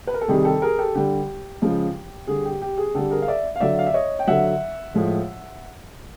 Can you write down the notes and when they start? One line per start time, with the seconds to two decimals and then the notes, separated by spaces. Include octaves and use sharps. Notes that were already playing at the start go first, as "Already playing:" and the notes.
0.07 B4
0.14 A#4
0.21 A4
0.28 C3 D#3 G3 G#4
0.45 G4 A4
0.62 G#4 A#4
0.78 G4 A4
0.95 D3 G3 G4
1.62 C#3 F3 G#3
2.27 D3 G3 G#4
2.45 G4
2.61 G4
2.78 G#4
2.95 D3 G3 G4 A4
3.11 G#4 A#4
3.22 F5
3.28 D5 E5
3.56 F5
3.60 D3 F#3 D5 E5
3.79 F5
3.86 E5
3.94 C#5 D#5
4.19 G5
4.27 D3 F#3 E5 F#5
4.94 A2 F3 G#3